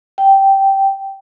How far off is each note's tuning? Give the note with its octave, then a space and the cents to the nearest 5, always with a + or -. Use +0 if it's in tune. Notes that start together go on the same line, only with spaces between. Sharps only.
G5 -10